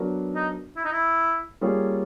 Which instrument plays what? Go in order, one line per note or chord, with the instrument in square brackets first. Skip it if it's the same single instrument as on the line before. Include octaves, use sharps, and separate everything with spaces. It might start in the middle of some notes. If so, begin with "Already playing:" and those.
Already playing: [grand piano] F#3 B3 D4 F#4 A#4
[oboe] D#4
E4
D#4
E4
[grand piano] G3 A#3 C#4 F4 G#4